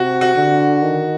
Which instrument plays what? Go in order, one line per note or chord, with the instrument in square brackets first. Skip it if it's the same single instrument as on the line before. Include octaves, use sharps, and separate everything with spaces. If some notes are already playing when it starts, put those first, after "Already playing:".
Already playing: [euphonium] C3 [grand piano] F#4
[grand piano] F#4
[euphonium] D3
D#3